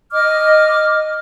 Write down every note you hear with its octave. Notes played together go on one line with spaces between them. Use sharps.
D#5 D6 F6